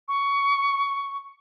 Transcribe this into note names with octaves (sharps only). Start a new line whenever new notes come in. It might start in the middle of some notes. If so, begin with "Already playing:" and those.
C#6